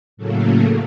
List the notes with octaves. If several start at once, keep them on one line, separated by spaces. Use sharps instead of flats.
A2 C#3 F#3 A3 A#3